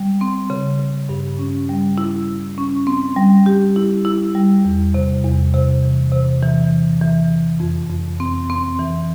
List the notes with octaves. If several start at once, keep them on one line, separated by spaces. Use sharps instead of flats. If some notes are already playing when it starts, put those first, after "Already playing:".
Already playing: G3
C4
C#3
C#3
G2
C#4
G3
E4
E4
C#4
C4
G3
G4
E4
E4
G3
E2
C3
E2
C3
E3
C3
E3
E3
E3
E3
F2
F2
C4
C4
E3